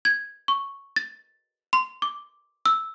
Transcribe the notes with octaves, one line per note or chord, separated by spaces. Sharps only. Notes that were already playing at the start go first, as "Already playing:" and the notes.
G#6
C#6
A6
C6
D6
E6